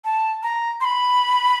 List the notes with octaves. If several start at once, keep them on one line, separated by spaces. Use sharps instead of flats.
A5
A#5
C6
B5